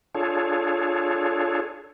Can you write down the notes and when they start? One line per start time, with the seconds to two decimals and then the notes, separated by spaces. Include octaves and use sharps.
0.15 D4 F4 G#4 A4 C#5